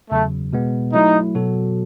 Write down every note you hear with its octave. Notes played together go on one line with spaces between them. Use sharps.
E2 C#3 F#3 A3
B2 G#3 B3
F#3 A3 D#4 E4
B2 F#3 B3 F#4 A4